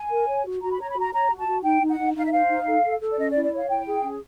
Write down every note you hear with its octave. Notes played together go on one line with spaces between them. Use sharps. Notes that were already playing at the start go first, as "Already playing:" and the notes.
Already playing: G#5
A#4
C#5
F#4
F#4 A#5
B5
C#5 A#5
B5
F#4 A#5
C#5 A#5
F#4
A5
F#4
D#4 G5
D#4
F#5
D#4
D#4 F5
E5
C5 F5
D#4
A4
A4
A4
D5
C#4 D#5
D5
E4
D5
C#5 F5
E4 G5
G#4
C#4